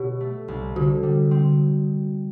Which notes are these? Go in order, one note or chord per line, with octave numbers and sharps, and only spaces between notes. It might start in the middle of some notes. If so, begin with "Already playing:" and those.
Already playing: B2 G4
A3
C2
D3 F#4
G3
C4